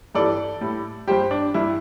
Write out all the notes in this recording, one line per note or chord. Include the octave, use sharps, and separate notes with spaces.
G2 E3 G3 A4 D5
A2 G3
G2 G3 G4 C5
D4
G2 G3 E4